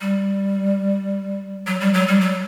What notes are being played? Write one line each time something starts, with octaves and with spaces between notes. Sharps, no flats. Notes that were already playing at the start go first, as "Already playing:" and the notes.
G3
F#3
G3
F#3
G3
F#3